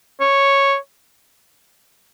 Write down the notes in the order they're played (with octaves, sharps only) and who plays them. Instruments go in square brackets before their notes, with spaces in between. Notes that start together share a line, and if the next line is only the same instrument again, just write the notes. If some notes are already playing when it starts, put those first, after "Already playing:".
[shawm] C#5